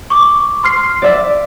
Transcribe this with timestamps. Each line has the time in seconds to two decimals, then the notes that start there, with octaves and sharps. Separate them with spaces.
0.10 C#6 D6
0.64 C6 F6 C7
1.02 D5 E5